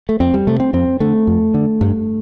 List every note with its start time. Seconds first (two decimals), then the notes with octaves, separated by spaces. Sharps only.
0.09 A3
0.20 F2 C4
0.34 G3
0.47 C3 A3
0.60 C4
0.73 F2 C4
1.00 D3 A3
1.27 F2
1.54 D3
1.81 G2